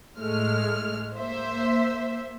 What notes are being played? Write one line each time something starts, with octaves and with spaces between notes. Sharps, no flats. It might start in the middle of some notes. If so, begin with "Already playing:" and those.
A2 G#3 A3 F6
A#3 C5 E5